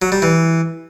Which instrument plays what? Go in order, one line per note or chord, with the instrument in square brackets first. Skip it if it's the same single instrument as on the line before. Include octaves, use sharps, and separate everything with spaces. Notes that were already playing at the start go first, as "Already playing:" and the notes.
[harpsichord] F#3
G3
E3